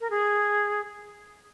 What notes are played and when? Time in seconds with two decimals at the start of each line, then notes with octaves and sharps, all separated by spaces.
0.01 A#4
0.10 G#4